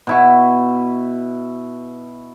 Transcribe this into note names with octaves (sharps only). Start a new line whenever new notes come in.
B2 E4 C#6